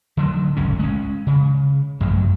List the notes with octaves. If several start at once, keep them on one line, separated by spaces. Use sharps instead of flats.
D3 D#3 F#3
D1 G1 C#2 C#4
G#3 C#4
C#3
A1 F#2 F3 F#3